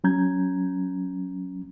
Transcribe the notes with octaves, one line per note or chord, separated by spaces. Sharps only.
F#3 C#4 A#5 G6 G#6